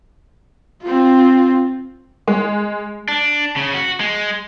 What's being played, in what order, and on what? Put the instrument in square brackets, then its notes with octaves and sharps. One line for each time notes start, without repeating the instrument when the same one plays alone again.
[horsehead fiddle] C4 F4
[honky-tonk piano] G#3
[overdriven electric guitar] D4
C#3
F#4
G#3